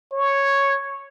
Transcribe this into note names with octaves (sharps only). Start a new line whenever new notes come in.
C#5